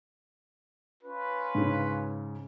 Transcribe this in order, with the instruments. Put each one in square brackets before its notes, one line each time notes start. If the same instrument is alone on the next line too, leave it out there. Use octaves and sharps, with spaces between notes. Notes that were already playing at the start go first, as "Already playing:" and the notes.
[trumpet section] C#4 F4 B4
[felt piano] G#2 C#3